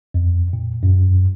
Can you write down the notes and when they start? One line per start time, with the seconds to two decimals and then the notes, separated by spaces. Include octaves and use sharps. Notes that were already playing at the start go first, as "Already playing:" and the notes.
0.14 F2
0.53 A#2
0.83 F#2